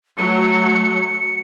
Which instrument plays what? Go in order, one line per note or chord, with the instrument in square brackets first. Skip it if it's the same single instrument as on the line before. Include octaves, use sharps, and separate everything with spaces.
[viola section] F#3 A3 [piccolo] C#7